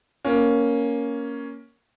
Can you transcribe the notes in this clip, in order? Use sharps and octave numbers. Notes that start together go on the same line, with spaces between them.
A#3 C#4